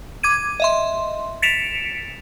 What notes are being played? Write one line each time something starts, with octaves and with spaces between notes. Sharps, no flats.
D6 G#6 D#7
D#5 E5 C6
A6 B6 C#7 D7 E7 F7